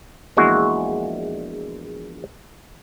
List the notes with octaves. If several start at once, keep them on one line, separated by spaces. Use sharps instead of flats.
A#1 E2 A#2 G#3 E4 F#4